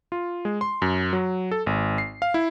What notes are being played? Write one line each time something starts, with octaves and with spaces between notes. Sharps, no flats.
F4
G#3
C6
F#2
F#3
A4
G#1
C7
F5
E4